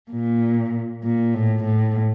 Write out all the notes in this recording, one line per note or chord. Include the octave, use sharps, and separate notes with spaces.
A#2
A#2
A2
A2